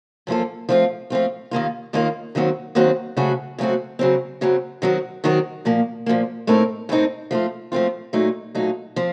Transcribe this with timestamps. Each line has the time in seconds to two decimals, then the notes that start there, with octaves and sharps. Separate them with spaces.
0.27 F#2 F3 A#3 F4 A4
0.69 F3 A3 C4 F4
1.10 F3 A3 C4 F4
1.51 D#2 D#3 A#3 F4
1.93 D#2 D#3 A#3 F4
2.35 D#2 D#3 F#3 C4 F#4
2.75 D#2 D#3 F#3 C4 F#4
3.17 C#3 F#3 A3 C4 F#4
3.58 C#3 F#3 A3 C4 F#4
3.99 F#2 C#3 F#3 C4
4.41 F#2 C#3 F#3 C4
4.82 D#3 F#3 C4 F#4 A#4
5.24 D#3 F#3 C4 F#4 A#4
5.65 A#2 F3 A#3
6.06 A#2 F3 A#3
6.47 A2 A3 C4 D#4 A#4
6.89 A2 A3 C4 D#4 A#4
7.31 F3 A3 C4 F4
7.72 F3 A3 C4 F4
8.13 A#2 F#3 A3 D#4
8.55 A#2 F#3 A3 D#4
8.96 F3 C4